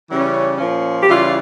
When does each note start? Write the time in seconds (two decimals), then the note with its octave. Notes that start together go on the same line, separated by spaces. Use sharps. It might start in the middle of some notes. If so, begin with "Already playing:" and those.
0.10 C#3 E3 G3 C#4
0.58 A#2 F3 C#4
0.99 G4
1.08 C#3 E3 G3 C#4 F4